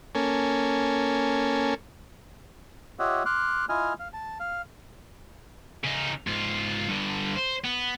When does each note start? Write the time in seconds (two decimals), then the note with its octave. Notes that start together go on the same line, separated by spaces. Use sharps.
0.15 A#3 C#4 A4 G#5
2.99 F4 G4 C#5 D#5 E5 F#5
3.26 C6 D6 F6 F#6
3.69 E4 F4 D#5 G#5 F6
3.99 F5
4.13 A5
4.40 F5
5.84 C#3 D#4
6.27 G#2 F4
6.88 G2 D3
7.36 C5
7.65 B3